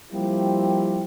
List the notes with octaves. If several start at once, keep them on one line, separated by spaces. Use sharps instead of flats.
F3 G3 A#3 C4 E4 G4